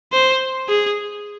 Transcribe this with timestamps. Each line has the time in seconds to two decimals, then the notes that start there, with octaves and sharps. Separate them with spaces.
0.13 C5
0.68 G#4